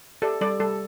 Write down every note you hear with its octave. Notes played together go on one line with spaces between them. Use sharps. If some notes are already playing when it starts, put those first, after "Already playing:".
G4 A4 D5
G3 A4 D5
G3 A4